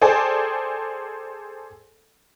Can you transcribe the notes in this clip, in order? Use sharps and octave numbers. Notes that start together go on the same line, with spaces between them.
G#4 A4 C5 D5 G5 G#5